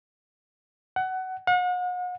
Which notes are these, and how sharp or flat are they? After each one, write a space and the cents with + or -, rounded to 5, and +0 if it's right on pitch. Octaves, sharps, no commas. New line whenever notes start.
F#5 +20
F#5 -40